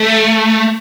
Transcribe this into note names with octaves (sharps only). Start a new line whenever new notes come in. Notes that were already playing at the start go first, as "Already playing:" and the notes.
Already playing: A3